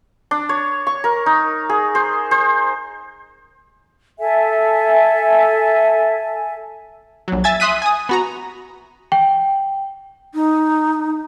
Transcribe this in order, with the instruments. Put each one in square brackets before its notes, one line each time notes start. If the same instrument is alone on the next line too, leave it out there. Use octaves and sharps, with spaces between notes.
[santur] D4
C#5
C#6
A#4
D#4
G#4
C5
C5
[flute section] A4 E5 G#5
[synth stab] A#1 F#3
E5 G#5 G#6 A6
E5 C6 D#6 F#6 B6 D#7
G#5 D#6
B3 F#4 A#5
[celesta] G5
[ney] D#4